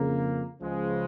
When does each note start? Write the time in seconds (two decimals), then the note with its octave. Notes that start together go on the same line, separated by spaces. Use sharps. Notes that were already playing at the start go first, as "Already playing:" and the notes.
Already playing: F2 C#3 A#3
0.61 C#2 C#3 F3 G#3